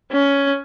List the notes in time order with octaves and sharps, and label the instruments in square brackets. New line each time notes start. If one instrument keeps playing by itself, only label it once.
[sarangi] C#4